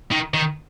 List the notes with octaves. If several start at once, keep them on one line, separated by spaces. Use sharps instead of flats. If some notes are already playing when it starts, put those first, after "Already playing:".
D#3
D#3